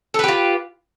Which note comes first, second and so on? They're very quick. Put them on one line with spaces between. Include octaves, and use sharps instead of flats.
A4 B4 G4 F4